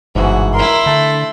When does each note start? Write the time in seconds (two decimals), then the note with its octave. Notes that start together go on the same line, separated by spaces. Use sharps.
0.15 G1 G#2 B2 E3 F#4
0.54 E4 A#4 C6
0.86 D3 A3 A#5